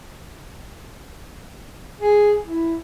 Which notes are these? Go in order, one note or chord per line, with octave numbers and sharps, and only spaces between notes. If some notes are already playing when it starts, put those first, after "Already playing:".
G#4
E4